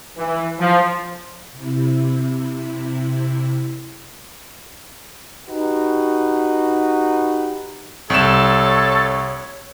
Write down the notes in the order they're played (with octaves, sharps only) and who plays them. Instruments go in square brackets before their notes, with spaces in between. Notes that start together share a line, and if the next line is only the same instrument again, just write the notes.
[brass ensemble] E3
F3
[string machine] C3 E4
[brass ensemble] D#4 F#4 G4 B4
[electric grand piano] C2 E7 [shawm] A4 [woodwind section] C#5